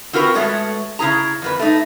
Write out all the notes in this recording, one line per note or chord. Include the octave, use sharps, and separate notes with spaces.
C4 F4 F#4 A#4 B4
G#3 A3 B3 F#4 C#5
C#3 E4 G#4 A#5
F2 B3 B4
A3 D#4